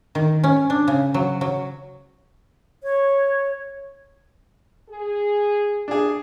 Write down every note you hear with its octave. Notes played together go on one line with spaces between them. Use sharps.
D#3
C#4
D4
C#3
F#3
F#3
C#5
G#4
D4 G#4